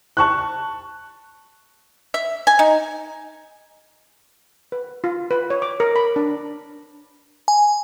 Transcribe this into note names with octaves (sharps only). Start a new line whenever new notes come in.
A5 C#6 F#6
E5
G#5
D#4
B4
F4
B4
C#5
D6
A#4
B5
D4
G#5